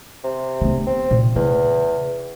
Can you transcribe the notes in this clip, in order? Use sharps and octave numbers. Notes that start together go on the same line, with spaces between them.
C3
D3 B3
C4
A#2
E2 C#3